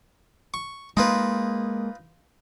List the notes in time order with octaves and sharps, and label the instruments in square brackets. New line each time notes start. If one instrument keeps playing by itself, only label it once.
[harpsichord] C#6
[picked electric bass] G#3 A#3 [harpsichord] D#4 F4 B4